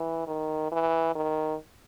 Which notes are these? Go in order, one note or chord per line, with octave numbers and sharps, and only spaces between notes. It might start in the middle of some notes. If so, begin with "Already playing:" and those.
Already playing: E3
D#3
E3
D#3